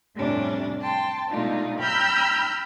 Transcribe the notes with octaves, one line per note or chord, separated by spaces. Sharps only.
F2 A2 C3 G3 C#4 D4
G5 A5 C6
B2 G#3 A3 D4 D#4 F4
G5 A#5 B5 E6 F6 G6